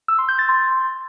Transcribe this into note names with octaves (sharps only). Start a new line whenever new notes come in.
E6
C6
G6
A6
C6